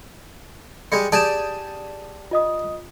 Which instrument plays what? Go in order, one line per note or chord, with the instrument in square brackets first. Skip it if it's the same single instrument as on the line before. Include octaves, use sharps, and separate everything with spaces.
[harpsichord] G3 G#3 [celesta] C#7
[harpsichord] G4 G#4 D5 [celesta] A5 G6 E7
[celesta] F4 D#5 D#6